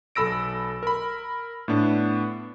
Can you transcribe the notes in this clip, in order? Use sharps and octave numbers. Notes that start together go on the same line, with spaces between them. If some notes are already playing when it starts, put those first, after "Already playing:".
B1 A4 B5 E6 A#6 D7
A#4 B5
A2 B3 D4